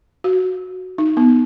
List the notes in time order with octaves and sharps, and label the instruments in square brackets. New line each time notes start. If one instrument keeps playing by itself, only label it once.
[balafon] F#4
D#4
B3